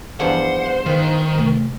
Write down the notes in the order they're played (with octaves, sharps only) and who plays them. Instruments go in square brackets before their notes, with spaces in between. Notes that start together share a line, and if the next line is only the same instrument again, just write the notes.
[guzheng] E2 G2 F3 [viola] C5 [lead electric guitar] F#5
[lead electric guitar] D#3 [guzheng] F4 B4
[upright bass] C3 A3